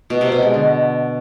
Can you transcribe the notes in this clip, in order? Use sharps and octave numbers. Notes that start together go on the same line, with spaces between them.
B2
C3
B2
G#3
D3